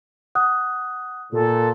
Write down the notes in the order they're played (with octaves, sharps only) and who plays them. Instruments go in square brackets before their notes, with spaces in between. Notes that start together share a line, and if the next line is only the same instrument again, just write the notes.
[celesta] F#5 D#6 F#6
[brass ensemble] A#2 [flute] A4